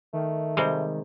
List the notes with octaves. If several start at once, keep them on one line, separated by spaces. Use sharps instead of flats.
D#3 A3
C3 G3 G#3